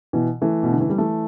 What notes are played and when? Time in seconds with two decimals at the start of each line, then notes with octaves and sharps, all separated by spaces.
0.13 B2 E3
0.41 E3 A3
0.63 B2
0.72 D3
0.80 E3
0.89 G3
0.98 E3 A3